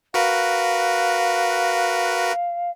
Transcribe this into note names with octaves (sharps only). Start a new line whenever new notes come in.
F#4 A#4 B4 F5